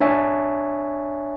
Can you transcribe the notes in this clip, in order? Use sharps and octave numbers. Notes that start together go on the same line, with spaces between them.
D4 C#5 E5 G#5